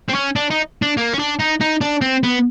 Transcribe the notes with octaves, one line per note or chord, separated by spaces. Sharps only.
C4
C#4
D4
D#4
D4
A#3
C#4
D4
D#4
D#4
D4
C4
B3